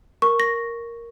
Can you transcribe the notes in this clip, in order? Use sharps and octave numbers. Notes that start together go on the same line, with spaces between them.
A#4 C#6
A#6